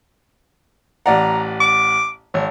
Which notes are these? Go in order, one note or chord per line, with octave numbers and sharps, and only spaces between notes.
A1 D5 F#5 A#5
D6
G#1 C#5